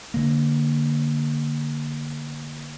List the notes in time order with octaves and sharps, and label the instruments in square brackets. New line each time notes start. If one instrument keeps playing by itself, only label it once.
[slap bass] D3 A#3